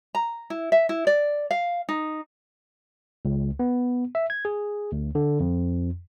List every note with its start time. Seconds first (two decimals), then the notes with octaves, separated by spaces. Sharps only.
0.15 A#5
0.50 E4
0.72 E5
0.89 E4
1.07 D5
1.51 F5
1.89 D#4
3.25 C#2
3.59 B3
4.15 E5
4.30 G#6
4.45 G#4
4.92 D2
5.15 D3
5.40 F2